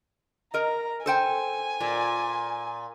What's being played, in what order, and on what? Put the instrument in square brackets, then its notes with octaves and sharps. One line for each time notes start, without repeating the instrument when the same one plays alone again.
[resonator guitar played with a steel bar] A#4 D#5 [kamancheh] A#5
[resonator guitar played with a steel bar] A4 C5 G5 [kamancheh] G#5
[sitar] A#2